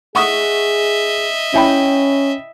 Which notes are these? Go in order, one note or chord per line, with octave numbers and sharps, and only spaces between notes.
G#4 D#5 E5 F#5 C#6 D#6
C#4 E4 G5 B5